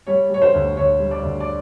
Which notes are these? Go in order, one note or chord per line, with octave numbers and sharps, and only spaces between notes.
G3 C#5
G3 C#5
C5
D2
D2 C#5
G3
D5
D2
D5